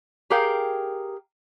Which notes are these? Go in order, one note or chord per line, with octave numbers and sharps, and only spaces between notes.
G4 G#4 A#4 F5 G5